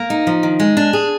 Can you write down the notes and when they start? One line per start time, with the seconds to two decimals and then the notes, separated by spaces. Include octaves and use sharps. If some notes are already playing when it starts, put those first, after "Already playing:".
Already playing: A#3
0.10 D#4
0.27 F3
0.43 D#3
0.60 G#3
0.77 D4
0.93 G#4